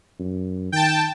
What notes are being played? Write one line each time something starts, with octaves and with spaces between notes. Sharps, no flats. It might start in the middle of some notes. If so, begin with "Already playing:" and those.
F#2
D#3 G5 A5